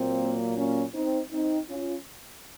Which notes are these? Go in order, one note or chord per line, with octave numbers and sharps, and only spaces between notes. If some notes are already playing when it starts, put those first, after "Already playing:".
Already playing: A#2 F#3 A#3 C4
A#3 C#4
C4 D#4
C4 D#4
C#4 F4